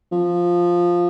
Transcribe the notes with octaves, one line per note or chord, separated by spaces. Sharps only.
F3